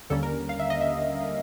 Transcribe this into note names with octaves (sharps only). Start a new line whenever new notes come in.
D#2 D3 G3 A#3 C#4 A4
A#4
F5
E5
D#5
E5